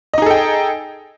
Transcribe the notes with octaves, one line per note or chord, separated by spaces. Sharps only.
D#4 G#4 A4 D#5 G5